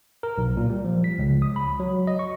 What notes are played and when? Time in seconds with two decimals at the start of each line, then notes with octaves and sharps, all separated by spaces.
0.23 A#4
0.38 B1
0.57 A#2
0.69 G3
0.85 F3
1.04 B6
1.19 C#2
1.42 D#6
1.56 B5
1.80 F#3
2.07 D#5
2.19 C#6